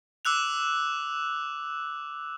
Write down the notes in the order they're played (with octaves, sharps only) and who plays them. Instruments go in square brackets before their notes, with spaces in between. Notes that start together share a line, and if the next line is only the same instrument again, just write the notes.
[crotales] D6 E6 F#6 F7